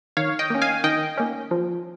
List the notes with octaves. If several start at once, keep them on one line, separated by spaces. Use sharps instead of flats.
D#3 C#5 F5
D#5 G5
A#3 C#4
F5 G#5
D#3 D#5 G5
A#3 C#4
F3